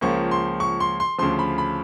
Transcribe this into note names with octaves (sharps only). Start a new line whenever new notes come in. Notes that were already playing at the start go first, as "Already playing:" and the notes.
C#2 C#3 F3 A#3 C#4 C#6
C6
C#6
C6
C6
D2 C#3 F3 C6
B5
B5